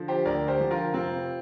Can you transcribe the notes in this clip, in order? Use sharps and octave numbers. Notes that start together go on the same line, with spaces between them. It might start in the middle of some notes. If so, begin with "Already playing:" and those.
Already playing: D3 F3
G4 C5
D2 A#4 D5
G4 C5
D3 F3
F4 A#4
F1 C4 F4